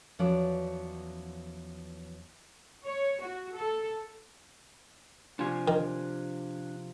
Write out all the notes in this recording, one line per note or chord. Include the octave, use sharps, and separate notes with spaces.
E2 F3 F#3 C#4 B4 D5
C#5
F#4
A4
C3 F3 D4 F4 G#5
D#3